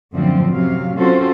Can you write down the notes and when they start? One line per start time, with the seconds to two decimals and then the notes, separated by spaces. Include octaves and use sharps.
0.14 F#2 A2 D3 F3 C4
0.52 F#2 C3 F#3 F5
0.98 C4 C#4 F4 F#4 A4 C5